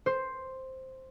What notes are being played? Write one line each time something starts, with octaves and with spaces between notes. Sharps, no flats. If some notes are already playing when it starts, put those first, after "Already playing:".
C5